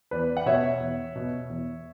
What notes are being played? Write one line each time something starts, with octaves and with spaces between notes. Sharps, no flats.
E2 B4 D5
F#5
B2 C#5 E5
E2
B2
E2